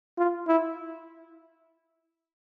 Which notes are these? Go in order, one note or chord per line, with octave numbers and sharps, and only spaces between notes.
F4
E4